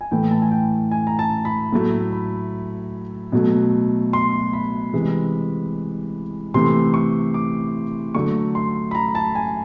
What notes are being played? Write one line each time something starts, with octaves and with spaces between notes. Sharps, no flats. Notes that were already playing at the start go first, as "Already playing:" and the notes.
G#5
A2 E3 A3 G5
A5
G#5
G5
G#5
A#5
A5
B5
A2 F#3 A3
B5
B2 F#3 A3
C6
B5
C3 E3 G#3
C3 E3 A3 C6
C#6
D6
D3 F#3 A3 C#6
C6
B5
A#5
A5
G#5